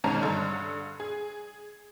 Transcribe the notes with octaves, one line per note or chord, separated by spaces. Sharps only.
G#1 G#2 B2 C#4 A5 A#5
G2 D3
G#4